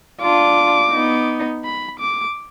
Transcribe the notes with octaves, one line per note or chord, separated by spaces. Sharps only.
D4 F4 D6
B3 D#4
B5
D6